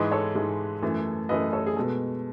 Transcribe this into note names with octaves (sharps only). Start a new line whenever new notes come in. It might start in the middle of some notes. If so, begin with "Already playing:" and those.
Already playing: G#2 E3 G#3 B4 D#5
A4 C#5
G#2 E3 G#3
F#2 E3 A3
F#2 E3 A3 B4 D#5
A4 C#5
G#4
B2 G#3 A4